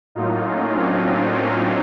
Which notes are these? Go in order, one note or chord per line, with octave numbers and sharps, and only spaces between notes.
A2 F#3 A#3 D#4 F4
C#4 D#4
C4 D4
C4
C#4